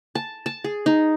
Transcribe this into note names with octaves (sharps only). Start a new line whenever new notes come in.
A5
A5
G#4
D#4